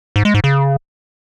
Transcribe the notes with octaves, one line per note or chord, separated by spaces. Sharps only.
G#2
G#3
G#2
C#3